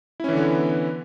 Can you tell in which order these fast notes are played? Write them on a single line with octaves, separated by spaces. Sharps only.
E4 C#4 E3 D3 B3